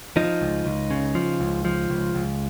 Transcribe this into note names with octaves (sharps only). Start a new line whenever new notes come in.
F3 D#4
C#2
C#2
C#3
F3
C#2
F3
C#2
C#2